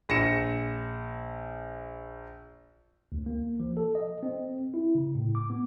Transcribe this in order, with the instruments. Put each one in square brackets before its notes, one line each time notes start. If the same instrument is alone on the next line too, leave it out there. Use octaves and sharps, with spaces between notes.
[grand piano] A#1 A#6 C#7 E7
[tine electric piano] D2
A#3
F3
A4
D#5
C4
E4
C#3
A2
D6
B3